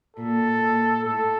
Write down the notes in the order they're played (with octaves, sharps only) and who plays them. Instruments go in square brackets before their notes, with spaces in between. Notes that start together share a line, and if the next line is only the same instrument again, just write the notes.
[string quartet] A#2 [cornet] A4
[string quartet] A#2
[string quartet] A2 [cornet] A4